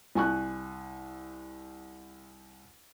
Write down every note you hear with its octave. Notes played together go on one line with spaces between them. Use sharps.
C2 G#5 C#6 F#6